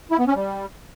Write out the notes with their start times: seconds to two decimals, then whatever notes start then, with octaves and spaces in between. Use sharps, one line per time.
0.11 E4
0.19 B3
0.27 C#4
0.35 G3